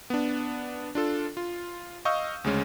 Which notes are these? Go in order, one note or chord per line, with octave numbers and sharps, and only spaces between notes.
B3 D4
D4 F4 A4
F4
D#5 F5 C#6 D#6 E6 G6
D2 C#3 G#3 C#4